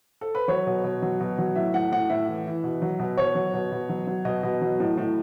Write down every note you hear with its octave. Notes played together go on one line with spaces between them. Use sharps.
A4
B4
F#3 C#5
B2
B2
F#3
B2
F#3
A2 E5
A2 F#5
A2 F#5
A2 E5
E3
E3
B2
F#3
B2
B2 C#5
F#3
B2
B2
F#3
F#3
B2 D#5
B2
F#3
A2
A2